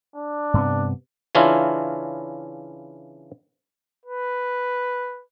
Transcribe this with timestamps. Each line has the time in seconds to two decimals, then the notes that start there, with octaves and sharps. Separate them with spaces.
0.15 D4
0.54 G2 C3 B3
1.35 C#3 E3 C#4 D4 E4 F4
4.05 B4